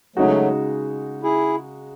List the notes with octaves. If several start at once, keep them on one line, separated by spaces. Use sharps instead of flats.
C#3 F#3 G#3 A3 D#4 F#4
E4 G#4